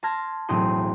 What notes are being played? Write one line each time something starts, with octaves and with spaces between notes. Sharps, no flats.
A5 C6 F6 G#6 A#6
E1 B1 A2 C4 G#4 C6